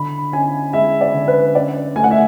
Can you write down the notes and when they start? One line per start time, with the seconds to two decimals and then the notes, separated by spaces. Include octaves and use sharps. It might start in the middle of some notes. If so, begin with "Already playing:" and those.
Already playing: D3 B5
0.32 C#4 G#5
0.73 G#3 E5
1.01 D5
1.14 D3
1.28 B4
1.54 C#4 D5
1.95 A3 G#5
2.04 F#5
2.11 E5